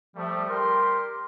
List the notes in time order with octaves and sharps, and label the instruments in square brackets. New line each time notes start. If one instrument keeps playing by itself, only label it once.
[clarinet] F3 [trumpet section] G3 A3
[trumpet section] G3 G4 C6 [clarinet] A#4